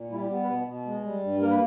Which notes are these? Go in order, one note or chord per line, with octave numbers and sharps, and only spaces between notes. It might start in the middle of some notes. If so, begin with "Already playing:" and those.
Already playing: A#2
G3 E4
G4
B3
B4
B2
B2
G#3
G3
G2
A#3 A#4
B4